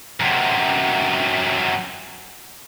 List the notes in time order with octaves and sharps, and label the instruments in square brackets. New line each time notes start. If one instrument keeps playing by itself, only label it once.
[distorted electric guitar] F#2 C3